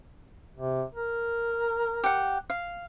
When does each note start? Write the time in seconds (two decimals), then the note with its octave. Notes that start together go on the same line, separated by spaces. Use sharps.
0.57 C3
0.95 A#4
2.04 G4 F#5
2.50 F5